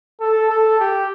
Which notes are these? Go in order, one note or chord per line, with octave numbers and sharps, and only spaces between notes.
A4
A4
G4